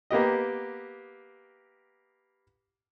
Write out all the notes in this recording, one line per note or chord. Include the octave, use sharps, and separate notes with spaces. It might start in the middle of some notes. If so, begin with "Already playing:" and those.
A#3 B3 G4 D#5